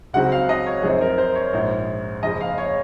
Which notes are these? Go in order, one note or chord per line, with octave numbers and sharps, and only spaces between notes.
C#2 C#3 F#3 C4 F#5
F5
D#5
C#5
F#2 F3 C4 D#4 G#4
A#4
C5
C#5
A#1 G#2 F3
F#1 F2 C#3 D#5
F5
C#5